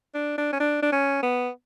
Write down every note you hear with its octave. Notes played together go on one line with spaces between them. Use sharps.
D4
D4
C#4
D4
D4
C#4
B3